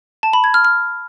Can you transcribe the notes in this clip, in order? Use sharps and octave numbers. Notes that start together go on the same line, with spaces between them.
A5
B5
G#6
F6
F6